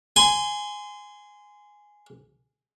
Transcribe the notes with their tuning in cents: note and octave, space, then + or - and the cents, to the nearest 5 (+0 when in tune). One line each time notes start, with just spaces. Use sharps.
G#5 +0 C6 -25